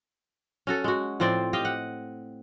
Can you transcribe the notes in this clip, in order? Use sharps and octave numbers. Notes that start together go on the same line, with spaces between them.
C#4 F#4 A4
G#3 F#4
A2 F3 C4 D5
G4 D#5 F5 G5
F#5